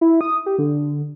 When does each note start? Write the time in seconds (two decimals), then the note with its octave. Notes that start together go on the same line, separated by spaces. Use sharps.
0.01 E4
0.21 D#6
0.46 G4
0.58 D3